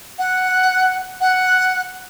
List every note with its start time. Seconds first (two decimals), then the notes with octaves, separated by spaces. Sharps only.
0.19 F#5
1.21 F#5